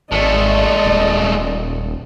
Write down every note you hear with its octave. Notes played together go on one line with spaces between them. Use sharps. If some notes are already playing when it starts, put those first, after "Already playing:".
G#1 G#3 A3 D5 D#5
D#1